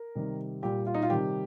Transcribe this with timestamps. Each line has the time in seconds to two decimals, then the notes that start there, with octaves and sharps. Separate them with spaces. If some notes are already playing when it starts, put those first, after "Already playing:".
Already playing: A#4
0.15 C3 D#3 G3
0.63 A#2 G3 G4
0.86 F4
0.95 D#4
1.03 F4
1.10 C3 D#3 G3 G4